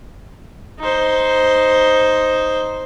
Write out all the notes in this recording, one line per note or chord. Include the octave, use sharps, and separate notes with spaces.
D#4 C5